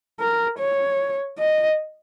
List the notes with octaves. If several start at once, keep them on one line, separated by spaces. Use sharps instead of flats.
A#4
C#5
D#5